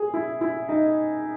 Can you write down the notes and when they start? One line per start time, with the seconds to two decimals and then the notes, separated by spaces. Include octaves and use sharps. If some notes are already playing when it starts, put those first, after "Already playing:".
Already playing: G#4
0.14 E4
0.41 E4
0.69 D#4